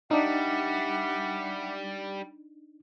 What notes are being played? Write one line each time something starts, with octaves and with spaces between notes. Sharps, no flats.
G3 D4 D#4 E5 F#5 D6